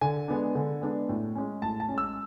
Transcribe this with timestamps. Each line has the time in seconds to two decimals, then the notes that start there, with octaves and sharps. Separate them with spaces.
0.01 D3 G#5
0.28 G#3 B3 D4
0.55 D3
0.81 G#3 B3 D4
1.09 A2
1.35 G#3 C#4
1.62 A2 A5
1.80 A5
1.88 G#3 C#4
1.98 E6